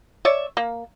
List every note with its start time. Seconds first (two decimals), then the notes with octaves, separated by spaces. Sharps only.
0.25 C#5 D5 E5
0.57 A#3